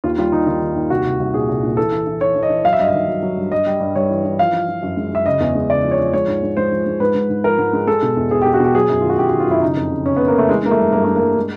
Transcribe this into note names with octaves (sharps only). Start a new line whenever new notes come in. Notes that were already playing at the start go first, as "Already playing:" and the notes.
D#2 F4
G3 F4
D#3 D#4
D#3 F4
D#3
D#2
C2 F#4
C2
C2
A#2 G#4
C2
A#2
E3 A4
E3
E3
E3 C#5
E3
D#5
E3
F#3 F5
E5
G2 D#5
E5
D#3
F#3
F#3
G2
G2 D#5
G3
G2
G2 C#5
E3
E3
F3 F5
F3
F3
F#2
G#3
F#2 E5
C#3 D#5
E2
G#3
C#3 D5
F3
C#5
F3
G#3 C#5
G#2
G#2
G#3 C5
F3
G#3
G#2 B4
G#2
G#2
F3 A#4
G#2
G#3
G#3 A4
B2
E2
E2 G#4
G4
E2
F#4
B2 G4
F#3 G#4
F#2
D#3 F4
F#4
F#2 G4
F#4
D#3
F4
F#2 E4
C#3 D#4
F2
C#3
C#3 C#4
B3
C#3
A#3
C#3 A3
E3 G#3
G#3 A#3
A3
G2
G2 A#3
G#3 A3
A#3
G2
G#3